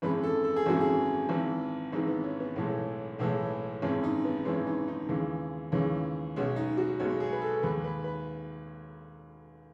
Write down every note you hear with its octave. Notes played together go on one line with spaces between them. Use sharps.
G#1 F#2 E3 G#3 B4
A4
A4
G#4
G#1 F#2 E3 G#3 F#4
G#4
G#1 G#2 E3
G#1 G#2 E3 D#4
B3
C#4
B3
B1 A2 E3 G#3
B1 A2 E3 G#3
G#1 F#2 E3 G#3 C#4
D#4
B3
G#1 F#2 E3 G#3 C#4
D#4
D#4
D#2 C#3 E3 G#3
D#2 C#3 E3 G#3 C#4
B1 B2 G#3 C#4
D#4
F#4
B1 B2 G#3 C#5
G#4
B4
A4
D#2 D#3 G#3 B4
B4
B4